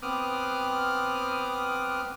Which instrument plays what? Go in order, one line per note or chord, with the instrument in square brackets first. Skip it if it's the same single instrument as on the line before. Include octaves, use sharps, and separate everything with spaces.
[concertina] B3 C4 D6 D#6 F6 F#6